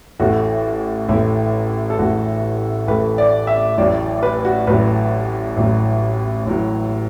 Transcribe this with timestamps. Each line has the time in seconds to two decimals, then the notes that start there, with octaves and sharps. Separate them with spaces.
0.19 A1 A2 A3 F#4
1.09 A1 A2 A3 E4
1.90 A4
1.99 A1 A2 A3 F#4
2.88 A1 A2 A3 B4
3.18 D5
3.47 E5
3.78 A1 A2 F#3 D5
4.23 B4
4.45 F#4
4.67 A1 A2 F#3 B4
5.57 A1 A2 F#3
6.46 A1 A2 F#3